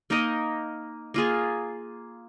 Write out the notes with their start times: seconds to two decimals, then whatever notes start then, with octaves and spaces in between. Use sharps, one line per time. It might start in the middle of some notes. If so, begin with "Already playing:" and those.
0.10 A#3 D#4 A#4 D#5
1.14 A#3 F4 G#4